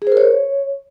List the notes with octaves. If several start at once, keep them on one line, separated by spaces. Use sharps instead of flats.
G#4
C5
A#4
C#5